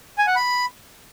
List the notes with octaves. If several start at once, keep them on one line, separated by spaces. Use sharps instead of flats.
G#5
F#5
B5